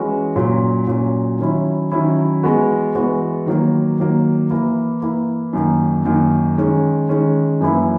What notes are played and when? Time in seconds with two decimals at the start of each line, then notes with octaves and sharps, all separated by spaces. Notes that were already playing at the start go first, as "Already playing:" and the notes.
Already playing: E3 G#3 C#4 F#4
0.36 A#2 F#3 C#4
0.87 A#2 F#3 C#4
1.39 D#3 F#3 C#4 E4
1.92 D#3 F#3 C#4 E4
2.43 E3 G#3 B3 F#4
2.95 E3 G#3 B3 F#4
3.46 D#3 F#3 A#3
3.98 D#3 F#3 A#3
4.50 E3 A#3 E4
5.02 E3 A#3 E4
5.53 F#2 D#3 A#3
6.05 F#2 D#3 A#3
6.58 D#3 G#3 C#4
7.09 D#3 G#3 C#4
7.60 F#2 E3 A#3 E4